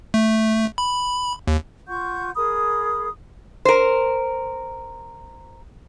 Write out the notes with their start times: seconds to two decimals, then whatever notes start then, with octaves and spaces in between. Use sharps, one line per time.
0.14 A3
0.78 B5
1.47 D#2
1.87 F4 F#5 C#6 G6
2.36 G#4 A#4 B5 D#6
3.65 A#4 C5